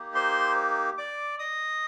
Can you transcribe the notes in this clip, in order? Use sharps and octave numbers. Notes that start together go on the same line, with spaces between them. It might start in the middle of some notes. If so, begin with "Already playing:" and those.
Already playing: A#3 D#4 G4
C5 C6
D5 D6
D#5 D#6